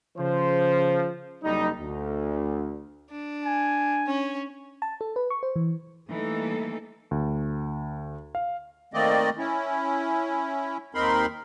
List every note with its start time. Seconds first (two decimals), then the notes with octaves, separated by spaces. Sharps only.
0.18 C#3 F3 C5
1.43 F#1 G3 D#4
1.79 D2
3.10 D4
3.45 G#5
4.07 C#4
4.82 A5
5.01 A4
5.16 B4
5.30 C#6
5.43 C5
5.56 E3
6.10 E3 G3 A3 A#3 D#4 A4
7.11 D2
8.35 F5
8.94 D#3 A3 A#3 C4 D5 D#5
9.38 C#4 E4
10.95 D#2 C4 D#4 A#4 B5 C6